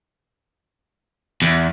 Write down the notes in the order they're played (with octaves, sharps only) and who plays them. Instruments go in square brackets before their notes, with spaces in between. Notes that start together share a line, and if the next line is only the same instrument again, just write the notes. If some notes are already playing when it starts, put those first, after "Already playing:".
[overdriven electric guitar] E2